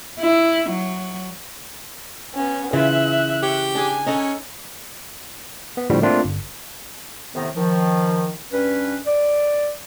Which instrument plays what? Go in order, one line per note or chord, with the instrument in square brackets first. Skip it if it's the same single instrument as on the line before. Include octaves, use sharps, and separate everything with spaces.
[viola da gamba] E4
F#3
[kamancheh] B3 C#4
[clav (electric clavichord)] C#3 [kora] E3 F4 B4 [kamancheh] E5 F#6
[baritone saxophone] G4 [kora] C#5
[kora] D4 G#4 [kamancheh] G#5
[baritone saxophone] C#4 [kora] D#4 A4 F#5
[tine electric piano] B3
A2 D3 F3 G3 F#4
A3 A#3 C4 D4 F4
G1
[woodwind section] A2 C3 D#3 B3 D#4
D#3 F3
G2 C#4 B4
D5